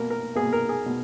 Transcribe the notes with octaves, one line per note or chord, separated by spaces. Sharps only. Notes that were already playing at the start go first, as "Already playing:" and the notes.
Already playing: B2 A#3 A#4
A#4
B2 A#3 G#4
A#4
G#4
B2